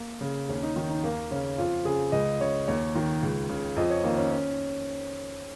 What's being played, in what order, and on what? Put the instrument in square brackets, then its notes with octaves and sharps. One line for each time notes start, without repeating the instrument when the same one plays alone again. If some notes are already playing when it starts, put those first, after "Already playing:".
Already playing: [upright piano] A#3
C#3
D#2 C#4
D#4
D#3
D#4
D#2 A#3
C#3 C#4
F2 F4
C#3 G#4
C#2 D#5
C#3 C#5
D#2 C#5
D#3
C#2
C#3
F2 D#5
C#5
D#3 A#3
C#4
C#4